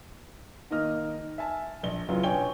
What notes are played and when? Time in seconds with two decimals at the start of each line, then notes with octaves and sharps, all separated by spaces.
0.71 D#3 A#3 D#5 F6
1.38 E5 G#5 A5
1.83 A#1 G7
2.09 F#1 E3 F#3 F4
2.23 B2 D4 C#5 G5 G#5 G7